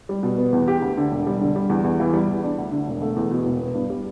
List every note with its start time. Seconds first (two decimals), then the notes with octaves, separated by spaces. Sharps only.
0.09 G3
0.23 B2
0.38 B3
0.52 E2
0.68 G4
0.82 D2
0.97 D3
1.11 E1
1.27 G3
1.41 D3
1.56 G3
1.70 E2
1.84 E2
2.00 E3
2.13 G3
2.28 E2
2.43 D4
2.58 D2
2.72 D3
2.88 E1
3.02 A3
3.16 E2
3.31 B2
3.46 E1
3.60 B3
3.74 G2
3.90 G3